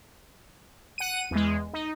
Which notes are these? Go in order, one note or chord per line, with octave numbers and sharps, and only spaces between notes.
F#5 D#7
E2 G#3
D#4